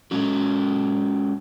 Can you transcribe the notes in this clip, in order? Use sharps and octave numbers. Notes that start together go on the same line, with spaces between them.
G#3 C#4 F#4